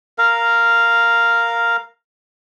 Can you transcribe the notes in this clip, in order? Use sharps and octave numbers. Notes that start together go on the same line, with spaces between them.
A#4 F5